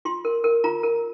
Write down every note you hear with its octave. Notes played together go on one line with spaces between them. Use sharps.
F4 C6
A#4
A#4
F4 A#5
A#4